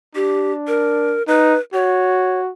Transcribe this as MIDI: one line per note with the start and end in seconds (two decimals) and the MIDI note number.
0.15 1.18 62
0.15 0.52 67
0.68 1.23 70
1.28 1.56 63
1.28 1.59 71
1.74 2.51 66
1.74 2.40 73